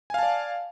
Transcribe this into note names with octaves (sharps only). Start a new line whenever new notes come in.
D5 F5 G#5 A5